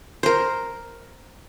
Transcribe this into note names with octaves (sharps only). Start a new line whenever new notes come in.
A#4 C5